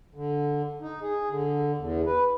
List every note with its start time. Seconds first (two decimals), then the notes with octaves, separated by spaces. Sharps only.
0.15 D3
0.81 D#4
1.02 G#4
1.29 D3
1.78 E2
2.07 B4